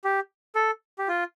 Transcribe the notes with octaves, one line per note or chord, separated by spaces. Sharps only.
G4
A4
G4
F4